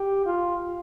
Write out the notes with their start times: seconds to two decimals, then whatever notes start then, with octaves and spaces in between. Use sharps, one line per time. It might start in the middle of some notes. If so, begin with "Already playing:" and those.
Already playing: G4
0.26 F4